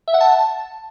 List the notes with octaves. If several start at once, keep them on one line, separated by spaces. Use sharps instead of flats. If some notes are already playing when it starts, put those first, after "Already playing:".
E5
F#5
A5